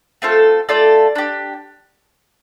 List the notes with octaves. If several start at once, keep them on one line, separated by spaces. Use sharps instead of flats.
A3 C4 F4 A4
A3 F4 A4 D5
D4 G4